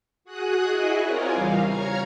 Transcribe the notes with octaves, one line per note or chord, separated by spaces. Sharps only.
F#4 G#4 D#6 F#6
E4 F#4 G#4 D#5
C4 F4 A#4 C#5 D5 G#5
E2 C#3 G3 F5
C#5 A#5 F6 G#6